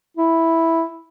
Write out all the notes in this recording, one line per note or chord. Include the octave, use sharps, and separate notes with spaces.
E4